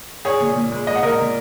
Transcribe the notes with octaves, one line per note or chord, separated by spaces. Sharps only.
G#3 G#4 C#5
A#2
A#2
G#3
G#3 D#5
F#5
A#2 A#4 D#5
A#2